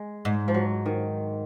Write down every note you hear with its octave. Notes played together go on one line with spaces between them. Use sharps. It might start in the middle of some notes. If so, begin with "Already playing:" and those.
Already playing: G#3
G#2
F3
F#3
D#3